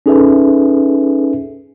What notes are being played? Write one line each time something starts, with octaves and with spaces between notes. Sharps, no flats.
C#4 D#4 G#4 A4 B4 E5